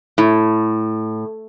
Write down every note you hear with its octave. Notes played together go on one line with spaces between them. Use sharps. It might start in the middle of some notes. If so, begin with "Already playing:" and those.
A2